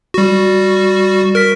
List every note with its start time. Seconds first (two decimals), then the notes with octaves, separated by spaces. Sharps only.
0.14 G3 F#4
1.35 A#4 F6 B6